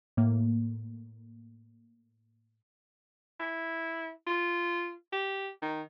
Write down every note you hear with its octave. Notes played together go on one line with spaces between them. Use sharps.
A2 A#3
E4
F4
G4
D#3